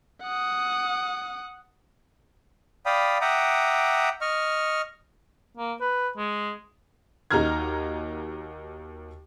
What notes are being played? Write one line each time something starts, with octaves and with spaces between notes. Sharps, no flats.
F#5 D#6
D5 F5 G5 B5 D#6
E5 F#5 G5 A#5 D6 D#6
D#5 C#6 F6
A#3
B4
G#3
D#2 D#4 F#4 A#5 F6 G#6